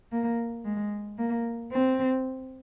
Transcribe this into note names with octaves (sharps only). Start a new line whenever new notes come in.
A#3
G#3
A#3
C4